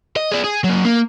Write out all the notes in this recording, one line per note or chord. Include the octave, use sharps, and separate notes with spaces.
D#5
G#4 D5
G#4
F#3 A#3
A#3